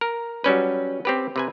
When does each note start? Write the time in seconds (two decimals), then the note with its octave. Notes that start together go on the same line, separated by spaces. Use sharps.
0.01 A#4
0.44 F#3 G3 C#4 B4
1.05 C4 G4 B4
1.36 C3 B4 G#5